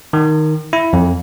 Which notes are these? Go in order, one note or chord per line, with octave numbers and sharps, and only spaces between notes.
D#3
E4
F2